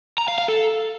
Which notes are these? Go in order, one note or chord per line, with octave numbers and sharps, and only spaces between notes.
A#5
F5
F5
A4